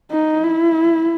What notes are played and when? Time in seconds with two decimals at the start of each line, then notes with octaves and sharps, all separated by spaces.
0.11 D#4
0.43 E4